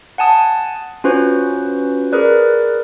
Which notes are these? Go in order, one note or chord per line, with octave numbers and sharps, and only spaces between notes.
F#5 G#5 A5 D#6
C#4 F4 F#4 B4 C5
G#4 A#4 B4 D5